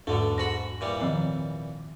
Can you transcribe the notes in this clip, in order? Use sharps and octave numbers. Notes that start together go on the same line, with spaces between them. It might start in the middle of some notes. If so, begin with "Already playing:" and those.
E2 G#2 B2 D3 A3
G#2 F#4 B5 A#6
A#2 E3 G3
D#3 F3 C4